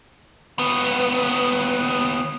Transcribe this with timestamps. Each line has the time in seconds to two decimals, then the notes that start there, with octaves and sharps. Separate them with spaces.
0.58 D#2 B3